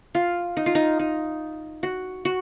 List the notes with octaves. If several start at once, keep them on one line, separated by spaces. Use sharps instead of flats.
F4
D#4
F4
D#4
D#4
F#4
F#4